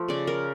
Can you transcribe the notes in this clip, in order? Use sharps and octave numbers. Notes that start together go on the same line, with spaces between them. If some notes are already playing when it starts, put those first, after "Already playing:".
Already playing: F3 A3
C#3 D5
A#4